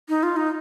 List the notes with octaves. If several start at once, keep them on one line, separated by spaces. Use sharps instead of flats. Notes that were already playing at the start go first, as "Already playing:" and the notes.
D#4
F4
D#4